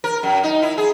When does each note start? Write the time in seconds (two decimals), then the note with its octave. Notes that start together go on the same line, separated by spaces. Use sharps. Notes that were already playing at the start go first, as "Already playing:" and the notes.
0.04 A#4
0.23 F#2
0.43 D#4
0.62 E4
0.78 G#4